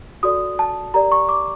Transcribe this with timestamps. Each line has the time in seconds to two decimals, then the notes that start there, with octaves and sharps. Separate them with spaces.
0.23 F#4 A4 D5 D#6
0.59 A5
0.94 G4 A#4 D5 A#5
1.12 C#6
1.29 D6